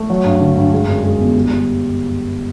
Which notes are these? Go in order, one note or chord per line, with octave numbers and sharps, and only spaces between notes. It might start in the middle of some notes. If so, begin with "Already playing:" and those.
Already playing: A3
F#3
G2
D3
G2
G#3
F#2
G#3
G1
G3
G3